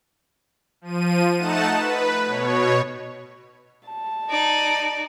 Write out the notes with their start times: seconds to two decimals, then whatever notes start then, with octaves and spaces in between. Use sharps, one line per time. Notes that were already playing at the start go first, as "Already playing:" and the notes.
0.81 F3 D#7
1.37 A3 D#4 F#5 A5 E7
1.76 B4
2.25 B2 C#5
3.88 A5
4.30 D#4 D5